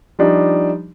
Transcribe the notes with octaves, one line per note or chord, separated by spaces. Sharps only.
F3 G3 D4 D#4